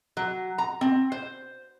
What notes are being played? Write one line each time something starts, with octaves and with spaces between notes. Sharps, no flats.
F#3
A#5
C4
C5